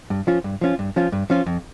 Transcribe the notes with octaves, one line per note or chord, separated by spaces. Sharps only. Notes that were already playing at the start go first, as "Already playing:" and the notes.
G2
F3 C#4 F4
G2
F3 C#4 F4
G2
F3 C#4 F4
G2
F3 C#4 F4
F2